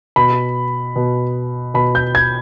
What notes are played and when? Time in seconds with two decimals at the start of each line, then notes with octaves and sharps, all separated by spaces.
0.16 B2 B5
0.96 B2
1.74 B2 B5
1.95 G6
2.15 G#6